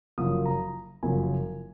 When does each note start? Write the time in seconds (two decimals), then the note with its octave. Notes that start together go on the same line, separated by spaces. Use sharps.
0.18 F#1 F#2 F3 D#6
0.46 A#5
1.03 F#1 F#2 F3 G#5